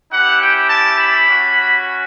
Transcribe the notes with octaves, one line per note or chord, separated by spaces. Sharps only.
C#4 E4 G4 F#5
G5
A5
B5
C#4 F#4